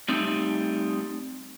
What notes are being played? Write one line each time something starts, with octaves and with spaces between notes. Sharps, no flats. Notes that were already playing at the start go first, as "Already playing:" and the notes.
G3 A3 C4 D#4